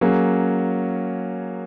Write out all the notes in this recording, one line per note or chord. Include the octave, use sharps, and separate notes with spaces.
F#3 A#3 C#4 G#4